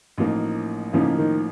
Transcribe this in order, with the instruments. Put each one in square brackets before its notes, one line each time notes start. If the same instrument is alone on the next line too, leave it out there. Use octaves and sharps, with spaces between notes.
[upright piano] A1 A2 F3 A#3 D#4
[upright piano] A1 A2 F3 A#3 D#4 [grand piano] C#3
[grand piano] D#3